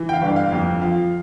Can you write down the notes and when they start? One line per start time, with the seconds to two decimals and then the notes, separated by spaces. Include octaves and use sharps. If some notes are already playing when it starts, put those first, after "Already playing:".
Already playing: E3
0.09 G5
0.13 F5
0.22 G1
0.36 F5
0.52 F2
0.81 F3 F5